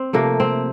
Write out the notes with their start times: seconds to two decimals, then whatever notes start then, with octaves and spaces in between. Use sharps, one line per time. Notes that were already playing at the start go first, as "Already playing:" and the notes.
Already playing: C4
0.13 C3 F3 A3 A#3
0.40 C4